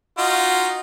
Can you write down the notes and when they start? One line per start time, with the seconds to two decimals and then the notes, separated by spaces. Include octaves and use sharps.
0.18 D#4 F4 F#4